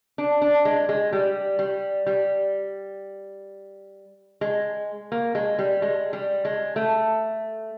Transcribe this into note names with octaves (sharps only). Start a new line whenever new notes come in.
D4
D4
G#3
G#3
G3
G3
G3
G#3
A#3
G#3
G3
G#3
G3
G#3
A3